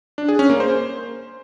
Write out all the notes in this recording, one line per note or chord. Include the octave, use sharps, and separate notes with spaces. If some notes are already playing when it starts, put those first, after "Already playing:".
D4
G#4
C#4
A#3
C5